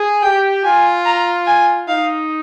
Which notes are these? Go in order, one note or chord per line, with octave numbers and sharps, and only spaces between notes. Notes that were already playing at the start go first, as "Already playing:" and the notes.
Already playing: G#4
G4 G5
F4 G#5
A#5
G#5
D#4 F5